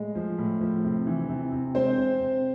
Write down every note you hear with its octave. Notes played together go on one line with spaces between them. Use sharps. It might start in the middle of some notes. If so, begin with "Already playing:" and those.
Already playing: A2 G#3
F3
A2
F3
C3
E3
C3
C3
G#3 C4 C5
C3
C3